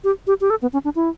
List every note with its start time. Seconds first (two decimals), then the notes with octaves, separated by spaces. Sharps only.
0.04 G4
0.27 G4
0.41 G4
0.50 A4
0.62 B3
0.73 C#4
0.84 D4
0.96 E4